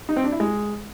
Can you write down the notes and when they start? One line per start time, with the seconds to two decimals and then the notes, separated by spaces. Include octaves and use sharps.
0.09 D#4
0.17 C4
0.24 D4
0.32 E4
0.40 G#3